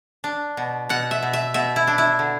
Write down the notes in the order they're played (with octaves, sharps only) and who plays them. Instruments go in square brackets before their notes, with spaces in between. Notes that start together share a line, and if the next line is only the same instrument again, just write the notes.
[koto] D4
B2
B2 F#5
E5
B2
E5
B2 E5
E4
D4
E4
D3